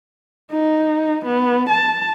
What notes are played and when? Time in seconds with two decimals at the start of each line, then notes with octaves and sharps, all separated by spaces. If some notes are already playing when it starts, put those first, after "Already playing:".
0.52 D#4
1.26 B3
1.70 A5